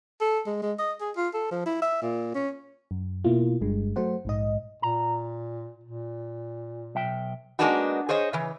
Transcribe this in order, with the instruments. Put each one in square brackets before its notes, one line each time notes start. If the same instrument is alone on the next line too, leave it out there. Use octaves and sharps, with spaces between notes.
[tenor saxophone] A4
G#3
G#3
D#5
G#4
F4
A4
F3
E4
E5
A#2
C#4
[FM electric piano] F#2
B2 A#3 E4 F4
G1 G2 G#3
F#3 A3 C5 F#5
A#1 G#2 D#5
[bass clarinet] A#2 [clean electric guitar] A#5
[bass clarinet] A#2
[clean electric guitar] B1 E5 G5
[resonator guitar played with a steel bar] G#3 A#3 B3 D4 D#4 F#4
G#4 C5 C#5 D#5
C#3 E3